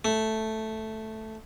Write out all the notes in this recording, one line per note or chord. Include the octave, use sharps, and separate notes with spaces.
A3